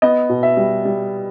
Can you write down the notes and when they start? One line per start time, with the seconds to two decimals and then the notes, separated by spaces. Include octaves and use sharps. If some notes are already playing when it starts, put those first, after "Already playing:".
0.02 B3 D#5
0.29 B2
0.43 E5
0.57 G3
0.85 G3